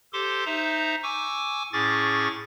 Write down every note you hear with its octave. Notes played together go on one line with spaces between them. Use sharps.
G4 A4 C5 C6 D6
D#4 C5 E5 A#5
G#5 C#6 D6 E6
A2 C#4 G#4 C#6 D6 A6